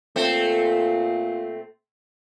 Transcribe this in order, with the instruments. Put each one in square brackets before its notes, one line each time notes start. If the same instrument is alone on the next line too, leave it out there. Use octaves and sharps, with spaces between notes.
[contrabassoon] A#2 [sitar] A3 C4